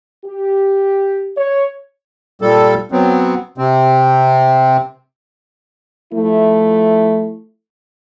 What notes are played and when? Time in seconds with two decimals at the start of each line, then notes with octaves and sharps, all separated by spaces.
0.25 G4
1.36 C#5
2.42 A#2 G3 A4
2.92 F#3 B3 C4
3.58 C3 C4
6.13 F3 A3 E4